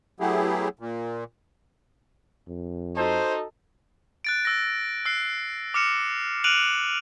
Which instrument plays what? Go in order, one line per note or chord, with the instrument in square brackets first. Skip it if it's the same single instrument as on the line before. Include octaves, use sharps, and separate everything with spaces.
[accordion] F#3 A3 B3 E4 G4 G#4
A#2
[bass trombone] F2
[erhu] D#4 [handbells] F#4 A4 A5 [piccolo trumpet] C5
[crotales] F#6 A6 D7
E6 A#6
E6 F#6 C7
D6 F6 C#7 E7
F6 F#6 D7 D#7 F7 F#7